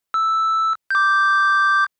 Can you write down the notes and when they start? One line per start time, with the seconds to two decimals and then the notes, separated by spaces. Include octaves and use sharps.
0.14 E6
0.90 D6 G6